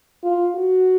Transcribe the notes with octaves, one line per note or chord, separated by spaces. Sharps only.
F4
F#4